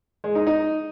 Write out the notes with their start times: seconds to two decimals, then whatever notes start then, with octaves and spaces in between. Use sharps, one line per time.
0.24 G#3
0.35 D#4
0.47 D#4